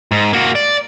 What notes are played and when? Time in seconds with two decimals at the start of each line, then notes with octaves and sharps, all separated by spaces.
0.12 G#2
0.33 A#3 F#4
0.55 D5